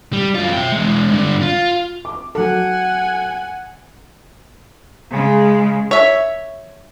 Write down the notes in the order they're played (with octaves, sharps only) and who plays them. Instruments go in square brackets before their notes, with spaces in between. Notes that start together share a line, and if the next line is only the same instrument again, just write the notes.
[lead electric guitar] G3
F#2 F4
E5 G5
E2 G#3
G2 D3
F4
[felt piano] D6
[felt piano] F#3 A4 [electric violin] F#5 G#5
[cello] C#3 G#3
[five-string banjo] C#5 E5